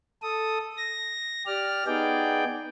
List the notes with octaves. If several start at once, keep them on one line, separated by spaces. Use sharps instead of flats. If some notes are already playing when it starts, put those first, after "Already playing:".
A4 D#6
A#6
G4 D5 F6
B3 D#4 G#4 D5 G5